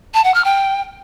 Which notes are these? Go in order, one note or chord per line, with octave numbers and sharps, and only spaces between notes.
A5
F#5
F6
G5